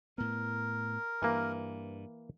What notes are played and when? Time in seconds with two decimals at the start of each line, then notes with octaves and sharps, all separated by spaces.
0.18 A2 B3 A#4
1.22 G2 E3 A#3